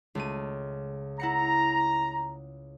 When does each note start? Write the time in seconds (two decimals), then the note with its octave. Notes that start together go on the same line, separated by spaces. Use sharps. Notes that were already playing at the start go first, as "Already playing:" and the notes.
0.15 C#2 A3 D#7
1.20 E4 F#5 A#5 C#7